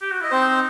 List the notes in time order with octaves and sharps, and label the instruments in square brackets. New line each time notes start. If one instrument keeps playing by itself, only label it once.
[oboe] G4
F#4
[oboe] E4 [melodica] D#5
[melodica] C4 C5 [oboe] D#4